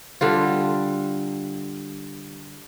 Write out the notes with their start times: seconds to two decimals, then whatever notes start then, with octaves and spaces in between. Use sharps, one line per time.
0.21 D3 G3 F4